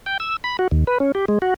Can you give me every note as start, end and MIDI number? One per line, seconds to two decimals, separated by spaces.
0.06 0.18 79
0.20 0.37 88
0.44 0.57 83
0.59 0.68 66
0.71 0.84 39
0.87 0.98 71
1.00 1.12 61
1.15 1.25 67
1.28 1.39 56
1.42 1.54 66